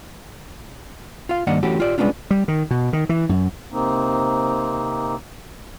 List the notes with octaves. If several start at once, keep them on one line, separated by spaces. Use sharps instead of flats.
F4 F5
G2 D#3 A#3 D4 D#5 F#5
E3 A3 C#4 F#4 G4
F4 G4 D5
G3 G#3 B3 C#4 D4 F4
G3
D#3
B2
D#3
E3
F#2
C3 A#3 C4 D#4